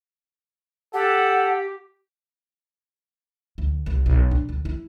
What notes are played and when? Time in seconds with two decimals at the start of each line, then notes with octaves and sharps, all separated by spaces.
0.94 G4 A4 F#5
3.58 D2
3.86 C2
4.06 B1
4.31 D4
4.49 D2
4.65 E4